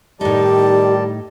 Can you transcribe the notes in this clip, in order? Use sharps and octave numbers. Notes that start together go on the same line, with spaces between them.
A2 D#3 G3 D#4 G4 D5 A5